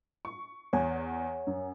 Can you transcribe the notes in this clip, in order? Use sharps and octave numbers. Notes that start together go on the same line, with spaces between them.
C#6
E2 C#5 F#5 G#5
F#2